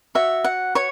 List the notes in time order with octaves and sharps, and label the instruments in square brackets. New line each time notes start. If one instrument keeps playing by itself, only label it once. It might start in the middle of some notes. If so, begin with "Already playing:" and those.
[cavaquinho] F#4 C#5 E5
F#5
C#5 C#6